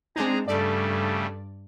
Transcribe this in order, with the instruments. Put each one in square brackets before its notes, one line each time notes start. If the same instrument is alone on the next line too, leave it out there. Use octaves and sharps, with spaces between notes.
[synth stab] G#3 D4 D#4 [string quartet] C4 [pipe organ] G#4 A#5
[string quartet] G2 [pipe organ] C#3 G3 A3 [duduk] A4 [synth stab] D5